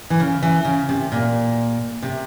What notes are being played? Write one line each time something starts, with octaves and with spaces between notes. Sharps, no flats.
E3
C#3
E3
C#3
C3
A#2
C3